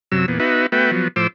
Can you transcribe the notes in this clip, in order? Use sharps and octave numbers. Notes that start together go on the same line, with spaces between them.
F#2 C3 F#3 E6
E2 A#2 B3
B3 D#4 F#4 B4 E5
A3 B3 F#4 B4 E5 G5
F3 F#3 B3
A2 F3 C5 D6 E6